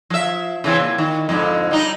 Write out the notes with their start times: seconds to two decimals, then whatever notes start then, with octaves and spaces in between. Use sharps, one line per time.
0.10 F3 E5
0.64 C#3 E3 C4
0.80 A#2
0.98 D#3
1.29 F2 G#2 D3
1.71 G3 D#4